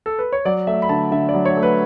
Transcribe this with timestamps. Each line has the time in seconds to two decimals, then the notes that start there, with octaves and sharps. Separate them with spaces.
0.06 A4
0.19 B4
0.33 C#5
0.45 F#3 D5
0.67 A3 E5
0.82 B5
0.89 D3 A5
1.11 D3 E5
1.29 D5
1.34 F#3
1.45 C#5
1.57 A3
1.63 B4